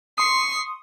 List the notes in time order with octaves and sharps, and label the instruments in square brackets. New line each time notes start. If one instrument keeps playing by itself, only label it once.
[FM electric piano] C6 D#6 [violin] C#6 C7